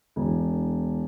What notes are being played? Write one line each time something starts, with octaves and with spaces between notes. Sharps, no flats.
E1